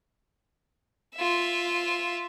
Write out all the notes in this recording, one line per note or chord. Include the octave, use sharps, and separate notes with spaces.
F4 E5